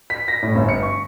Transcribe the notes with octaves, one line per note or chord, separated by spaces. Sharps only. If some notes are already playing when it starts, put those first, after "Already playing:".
B6
A#6
A2
G1
C#7
C#6